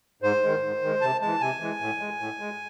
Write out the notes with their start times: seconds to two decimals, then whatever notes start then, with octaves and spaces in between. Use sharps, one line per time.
0.22 G#2 C5
0.43 D#3 G#3
0.62 G#2
0.82 D#3 G#3
1.01 C3 A5
1.21 E3 G#3 A5
1.41 C3 G#5
1.60 E3 G#3
1.81 A2
2.00 G#3
2.20 A2
2.40 G#3